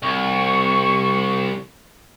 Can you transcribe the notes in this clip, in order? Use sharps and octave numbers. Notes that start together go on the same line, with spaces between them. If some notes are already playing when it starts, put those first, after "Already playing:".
C2 C#6